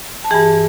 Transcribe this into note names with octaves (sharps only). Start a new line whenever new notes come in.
A5
G2 E3 G#4 G#5